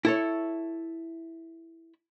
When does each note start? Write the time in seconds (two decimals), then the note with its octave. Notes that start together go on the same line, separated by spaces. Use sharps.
0.05 E4 A4 C#5